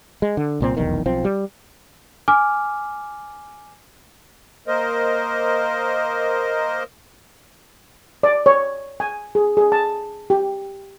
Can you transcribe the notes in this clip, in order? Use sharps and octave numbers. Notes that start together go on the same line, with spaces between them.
G#3
D3
C2 A#2 C4
F1 B1 E2 D#3
B1 F3 C4
G3
G#5 D6 F6
A#3 A#4 C5 D#5
D5
C#5
G#5
G#4
G#4
A5
G4